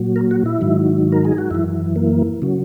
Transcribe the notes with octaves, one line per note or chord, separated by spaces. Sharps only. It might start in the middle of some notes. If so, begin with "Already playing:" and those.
Already playing: A#2 F#3
A#4
F#4
E4
G#2 D#3 F#3
A#4
G#4
F#4
F#2 E3 E4
A#3
C#3 F#3